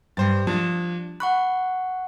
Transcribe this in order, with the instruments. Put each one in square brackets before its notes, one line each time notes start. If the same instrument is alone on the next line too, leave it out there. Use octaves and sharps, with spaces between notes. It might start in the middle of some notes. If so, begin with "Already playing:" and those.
[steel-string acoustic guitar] G2 [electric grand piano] G3 C5 A6
[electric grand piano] F3 D4 [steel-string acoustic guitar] A5
[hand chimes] F#5 C#6 F#6 [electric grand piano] B5